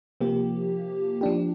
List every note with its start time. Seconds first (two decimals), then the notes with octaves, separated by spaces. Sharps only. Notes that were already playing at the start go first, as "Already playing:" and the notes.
0.21 C3 F3 A#3 G4
1.21 F3 D4 G4